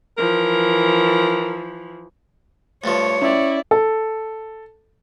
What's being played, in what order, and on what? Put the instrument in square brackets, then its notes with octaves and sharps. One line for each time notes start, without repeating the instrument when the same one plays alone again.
[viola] E3 F3 [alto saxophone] A#4
[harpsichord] D2 G2 F3 [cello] C#5
[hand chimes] C#4 [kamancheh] E4 D5
[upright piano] A4